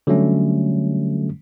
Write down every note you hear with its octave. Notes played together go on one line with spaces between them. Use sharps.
D3 F#3 G3 A3 C#4